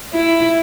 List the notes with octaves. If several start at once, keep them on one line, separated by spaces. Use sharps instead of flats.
E4